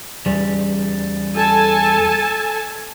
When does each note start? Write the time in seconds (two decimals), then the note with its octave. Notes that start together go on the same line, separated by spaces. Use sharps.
0.26 E2 G3
1.35 A4 G#5 A5